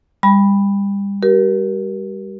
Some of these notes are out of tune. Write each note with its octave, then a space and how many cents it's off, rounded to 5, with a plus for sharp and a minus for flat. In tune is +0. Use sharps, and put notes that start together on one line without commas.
G3 +30 B5 +0
G4 -35 A#4 +20